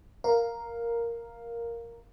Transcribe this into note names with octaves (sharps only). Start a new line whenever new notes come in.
A#4 F5